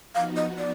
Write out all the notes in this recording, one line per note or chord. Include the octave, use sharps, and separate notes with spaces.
F3 B3 D#4 F#4 F5
D#5
D5